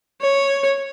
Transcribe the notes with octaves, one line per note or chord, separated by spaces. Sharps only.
C#5